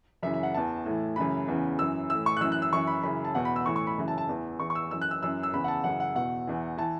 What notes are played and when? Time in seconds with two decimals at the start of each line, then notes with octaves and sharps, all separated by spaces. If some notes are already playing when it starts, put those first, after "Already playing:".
0.23 F#2 C#3 E3 E5
0.34 E5
0.43 F#5
0.54 E2 E3 A5
0.85 A2 E3
1.16 F#2 C#3 E3 B5
1.48 E2 C#3 E3
1.78 F#2 E3 E6
2.10 A2 E3 E6
2.26 C#6
2.37 F#6
2.41 F#2 E3 E6
2.52 F#6
2.62 E6
2.73 F#2 E3 C#6
2.87 B5
3.03 F#2 C#3 E3 B5
3.25 A5
3.35 E2 B2 F#5
3.45 B5
3.56 E6
3.66 A2 E3 C#6
3.76 C#6
3.87 B5
3.98 F#2 C#3 E3
4.08 A5
4.18 A5
4.29 E2 E3
4.59 E2 E3 C#6
4.70 C#6
4.75 E6
4.91 F#2 E3 E6
5.02 F#6
5.11 E6
5.22 F#2 E3 E6
5.43 E6
5.53 E2 C#3 E3 B5
5.64 F#5
5.68 A5
5.84 F#2 C#3 E3 F#5
6.00 F#5
6.15 E2 B2 F#5
6.47 E2 E3
6.78 E3 A5